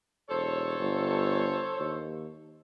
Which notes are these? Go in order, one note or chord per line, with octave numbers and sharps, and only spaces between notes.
E1 A4 C5 C#5
G1
D#2